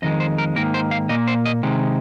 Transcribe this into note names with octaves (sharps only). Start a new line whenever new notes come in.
F2 D#3 G#3 D#5
C5
A#4
G#2 D#3 A#3 A#4
C5
F5
A#2 A#3 D#5
C5
D#5
C3 D#3 G#3